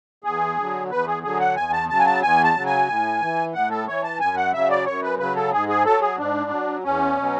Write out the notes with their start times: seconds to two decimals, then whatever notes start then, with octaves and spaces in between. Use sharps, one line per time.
0.24 E2 G#4
0.57 D3 F#3
0.90 E2 B4
1.07 G#4
1.23 D3 F#3 G#4
1.40 F#5
1.57 E2 G#5
1.72 A5
1.89 C#3 F#3 A5
1.99 G#5
2.06 A5
2.22 E2 G#5
2.44 A5
2.56 C#3 F#3
2.66 G#5
2.88 A2
3.21 E3
3.54 A2 F#5
3.70 A4
3.87 E3 C#5
4.03 A5
4.20 F#2 G#5
4.37 F#5
4.53 C#3 F#3 E5
4.70 D5
4.86 F#2 C#5
5.03 B4
5.19 C#3 F#3 B4
5.36 A4
5.52 G#2 G#4
5.68 G#4
5.85 F#3 A4
6.01 G#4
6.18 G#2 D4
6.51 F#3
6.84 E2 C#4
7.17 B2 F#3